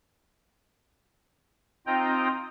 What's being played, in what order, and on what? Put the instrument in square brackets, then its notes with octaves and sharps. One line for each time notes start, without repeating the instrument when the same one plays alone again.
[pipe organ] C4 D#4 F4 D#5 G5 A#5